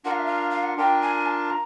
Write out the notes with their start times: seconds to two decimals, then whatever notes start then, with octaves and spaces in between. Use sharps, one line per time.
0.05 D4 F4 A#4 F#5
0.11 F5
0.19 E5
0.26 F5
0.51 F5
0.63 F#5
0.77 D4 F4 A#4 G5
1.02 G#5
1.26 A5
1.50 A#5